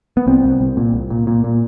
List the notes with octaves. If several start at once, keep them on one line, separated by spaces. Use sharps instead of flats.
B3
C2 C4
C2
C2
A#2
C2
A#2
A#2
A#2